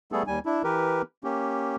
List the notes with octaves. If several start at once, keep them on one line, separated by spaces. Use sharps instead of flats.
G3 A3 B3 G#4 A4
D#2 G3 G#5
D4 E4
E3 G4 A#4 B4
A#3 C#4 G4